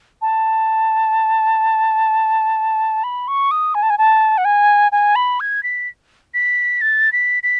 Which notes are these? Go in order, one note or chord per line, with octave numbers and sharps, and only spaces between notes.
A5
B5
C#6
D#6
G#5
A5
G#5
A5
F#5
G#5
G#5
B5
G#6
B6
B6
A6
B6
B6